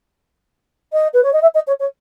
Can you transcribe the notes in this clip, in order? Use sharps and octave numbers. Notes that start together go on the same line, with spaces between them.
D#5
B4
C#5
D#5
E5
D#5
C#5
C#5